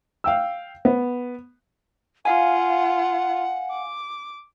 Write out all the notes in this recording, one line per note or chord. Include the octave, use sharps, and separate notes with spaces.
F5 G5 E6
B3
F4 F5 F#5 G#5
D6